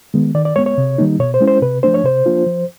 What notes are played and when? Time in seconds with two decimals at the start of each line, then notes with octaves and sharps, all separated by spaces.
0.14 D#3 G#3 B3
0.34 D#3 D5
0.45 D5
0.56 G#3 C#5
0.58 B3
0.66 C#5
0.78 C3
0.98 D#3 G3 A#3 D#4
1.19 B2 C#5
1.34 C5
1.40 G#3 C#4 E4
1.48 C5
1.62 C3 B4
1.83 F3 A3 D4 C5
1.94 C#5
2.04 C3 C5
2.26 F3 A#3 D4 F4
2.46 F3